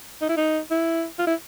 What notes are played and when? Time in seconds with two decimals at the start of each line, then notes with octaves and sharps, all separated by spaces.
0.21 D#4
0.29 E4
0.37 D#4
0.71 E4
1.19 F4
1.27 E4